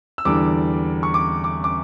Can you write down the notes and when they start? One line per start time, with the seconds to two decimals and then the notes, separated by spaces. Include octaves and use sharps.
0.18 E6
0.25 E2 D3 G3 D6
1.03 C#6
1.14 D6
1.44 D6
1.64 D6